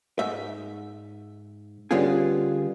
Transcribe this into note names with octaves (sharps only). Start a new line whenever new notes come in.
G#2 E5
D3 G3 B3 C#4 F4 G#4